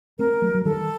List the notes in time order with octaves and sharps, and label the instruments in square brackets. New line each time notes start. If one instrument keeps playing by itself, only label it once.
[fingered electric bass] A3 C4 [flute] A#4
[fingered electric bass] F#3 A3
F#3
[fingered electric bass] D#3 G3 [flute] A4